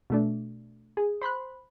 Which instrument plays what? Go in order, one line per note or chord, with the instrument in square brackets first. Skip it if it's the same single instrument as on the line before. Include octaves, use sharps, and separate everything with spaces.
[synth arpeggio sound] B2 A3 D4
G#4
C5 B5 C6 F#6